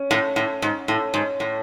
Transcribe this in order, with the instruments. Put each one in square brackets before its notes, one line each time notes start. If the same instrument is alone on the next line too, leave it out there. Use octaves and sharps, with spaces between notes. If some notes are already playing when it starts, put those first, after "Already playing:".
Already playing: [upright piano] C#4
[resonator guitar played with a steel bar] A2
A2
G#2
A2
G#2
A2